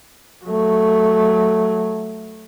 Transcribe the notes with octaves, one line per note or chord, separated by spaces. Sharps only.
F#3 A3